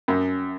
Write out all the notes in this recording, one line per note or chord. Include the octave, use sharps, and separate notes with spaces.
F#2